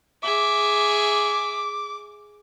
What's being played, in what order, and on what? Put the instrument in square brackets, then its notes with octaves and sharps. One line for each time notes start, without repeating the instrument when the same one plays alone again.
[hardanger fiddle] G#4 E5 [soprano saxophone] D6